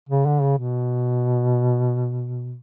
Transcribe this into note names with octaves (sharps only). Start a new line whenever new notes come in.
C#3
D3
C#3
B2